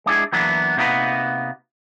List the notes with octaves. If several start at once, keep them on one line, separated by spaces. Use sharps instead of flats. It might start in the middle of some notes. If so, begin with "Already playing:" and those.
G#3 D4 E4 G#4
E3 F#3 A#3 B3 D4
C3 A#3 B3 D#4 F#4 B4